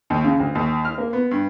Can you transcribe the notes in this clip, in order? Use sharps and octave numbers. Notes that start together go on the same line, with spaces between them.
D#2
C#3
D2
D#2
F6
A#3
B3
G2